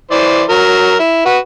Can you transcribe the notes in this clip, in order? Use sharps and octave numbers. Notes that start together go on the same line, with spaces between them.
E3 C5 D5
F#3 A#4
E4
F#4 B4